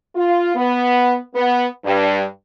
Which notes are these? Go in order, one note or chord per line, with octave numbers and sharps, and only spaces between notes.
F4
B3
B3
G2